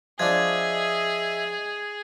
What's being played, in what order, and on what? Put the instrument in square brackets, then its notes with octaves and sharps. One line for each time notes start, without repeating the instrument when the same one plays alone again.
[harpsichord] F3 D4 [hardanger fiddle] G#4 [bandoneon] D#5 E5 [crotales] G#6